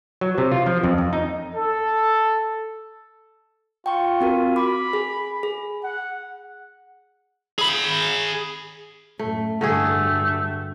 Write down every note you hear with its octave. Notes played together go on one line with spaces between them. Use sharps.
F#3
C3
F4
F3
F2
F2
D#4
A4
F4 G5 C#6
C4 F#4 A#4
B5 D6
G#4
G#4
F#5
G#4 B5
F#2 A2 A3
G2 D3 G3 A3 F#4 G#4